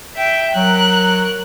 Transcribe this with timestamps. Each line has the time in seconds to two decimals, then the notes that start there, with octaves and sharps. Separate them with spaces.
0.16 E5 G5
0.56 F#3 A#4 F#6